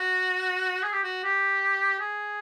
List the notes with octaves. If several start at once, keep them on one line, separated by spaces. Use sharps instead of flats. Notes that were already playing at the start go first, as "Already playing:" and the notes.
Already playing: F#4
G#4
G4
F#4
G4
G#4